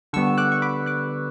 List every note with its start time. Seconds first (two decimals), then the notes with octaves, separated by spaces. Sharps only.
0.13 D3 G3 B3 C#6 E6
0.38 D6 F#6
0.52 C#6
0.62 B5 D6
0.86 D6 F#6